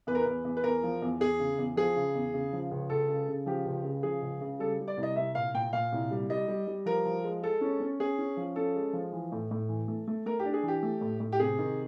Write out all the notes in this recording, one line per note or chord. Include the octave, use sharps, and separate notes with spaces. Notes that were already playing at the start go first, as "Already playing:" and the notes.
E2 B4
A#4
E2 B4
E2
B4
E2 A#4
F3
E2
E2 G#4
C#3
E2
F3 G#4
C#3
E2
C#3
F3
C#2
C#2 A4
C#3
C#3
F3 G4
C#2
C#3
F3 G#4
C#2
C#3
G3 A4
G3
D5
C2
D#5
C2 E5
A#2 F5
A#2 G5
A#2 F5
C2
G3
G3 D#5
G3
G3
F3 A#4
F3
G#3
G#3 A4
C#4
C#4
C#4 G#4
C#4
F3
C#4 A4
G#3
F3
E3
A2
A2
E3
A3
A3
A3 A#4
G4
D4
G#4
E3
G4
A3
A2
A2
G4
C3 G#4
D#3